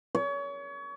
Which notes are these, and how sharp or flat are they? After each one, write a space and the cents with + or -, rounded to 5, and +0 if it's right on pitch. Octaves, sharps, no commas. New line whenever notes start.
C#5 +30